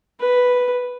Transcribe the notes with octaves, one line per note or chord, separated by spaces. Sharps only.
B4